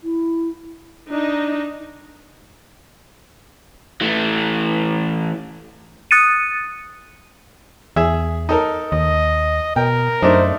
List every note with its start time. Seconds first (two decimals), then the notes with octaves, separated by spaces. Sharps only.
0.04 E4
1.10 D4 D#4
4.01 E3 A3
6.11 D#6 F#6 A6 C#7 D#7
7.96 E2 G#4 E5
8.49 D#4 A4 A#4
8.92 D#2 D#5
9.76 B2 A#4 G5
10.22 F#2 A3 D4 D#4 C5